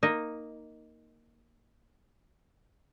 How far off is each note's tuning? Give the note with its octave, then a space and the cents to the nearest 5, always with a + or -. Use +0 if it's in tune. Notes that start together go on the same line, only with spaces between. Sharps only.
A#3 +0 D#4 +0 D#5 +0